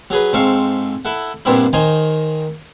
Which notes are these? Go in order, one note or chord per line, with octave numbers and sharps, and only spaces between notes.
F#3 G#4 B4
G#2 C4 A4 F5 C#6
E4 A4 F#5
G2 A#2 B3 C4 D4 E4
D#3 D#4 C5 G#5 A#5